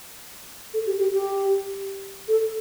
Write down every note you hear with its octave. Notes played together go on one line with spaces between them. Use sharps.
A4
G4
G4
G4
A4